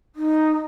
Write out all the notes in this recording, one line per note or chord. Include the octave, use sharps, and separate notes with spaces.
D#4